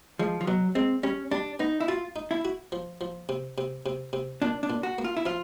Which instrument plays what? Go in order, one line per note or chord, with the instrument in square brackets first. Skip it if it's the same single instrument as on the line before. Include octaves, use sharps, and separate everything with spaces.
[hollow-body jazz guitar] F3 [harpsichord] G#3
[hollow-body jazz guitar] F3
[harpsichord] B2 [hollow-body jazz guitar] F#3
[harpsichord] G#3 [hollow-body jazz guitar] C4
[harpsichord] G3 [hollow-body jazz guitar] C#4
[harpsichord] G3 [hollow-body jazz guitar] D4
[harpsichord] B3 [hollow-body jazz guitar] D#4
[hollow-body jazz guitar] E4
[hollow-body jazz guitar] F4 [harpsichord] F#4
[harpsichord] D#4
[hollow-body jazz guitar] E4
[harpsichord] F#4
F3
F3
C3
C3
C3
C3
[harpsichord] A#2 [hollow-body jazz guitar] D4
[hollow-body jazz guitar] D4
[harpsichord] A#2
[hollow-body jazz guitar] F#4
[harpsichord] A#3
[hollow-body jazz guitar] F4
E4
[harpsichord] F3 [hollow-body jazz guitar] F4